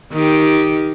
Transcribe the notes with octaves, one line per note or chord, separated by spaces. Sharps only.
D#3 G4